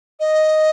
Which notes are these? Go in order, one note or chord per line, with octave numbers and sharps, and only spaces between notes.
D#5